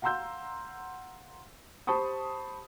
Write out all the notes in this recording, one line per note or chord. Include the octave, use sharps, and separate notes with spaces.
F5 F#5 A#5 C6 E6 G6
G4 C5 A5 B5 C#6 D#6